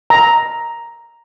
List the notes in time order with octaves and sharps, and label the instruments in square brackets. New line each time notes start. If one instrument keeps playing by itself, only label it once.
[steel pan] A#5